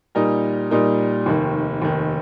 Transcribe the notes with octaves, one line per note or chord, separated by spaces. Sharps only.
A#2 G3 D#4 A#4
A#2 G3 D#4 A#4
F1 D#2 D#3
F1 D#2 D#3